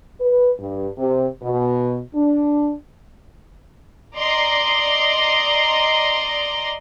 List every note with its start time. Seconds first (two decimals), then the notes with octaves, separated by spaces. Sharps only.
0.20 B4
0.59 G2
0.98 C3
1.43 B2
2.15 D4
4.16 D5 D#5 A#5 C6